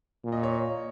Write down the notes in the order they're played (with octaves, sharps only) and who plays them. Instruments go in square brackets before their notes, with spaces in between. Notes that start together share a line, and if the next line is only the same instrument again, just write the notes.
[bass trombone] A#2
[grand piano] D#5
C#5